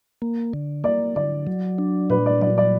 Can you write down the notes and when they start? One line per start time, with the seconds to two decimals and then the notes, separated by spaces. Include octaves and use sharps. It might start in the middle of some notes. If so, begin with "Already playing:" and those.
0.22 A#3
0.53 D3
0.84 A#3 D5
1.16 D3 D5
1.47 F#3
1.78 D4
2.10 A#2 B4
2.26 D5
2.41 F#3 D5
2.58 D5